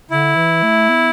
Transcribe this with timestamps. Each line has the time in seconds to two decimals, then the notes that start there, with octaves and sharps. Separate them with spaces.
0.10 D3 E4
0.36 E3
0.63 A3
0.89 B3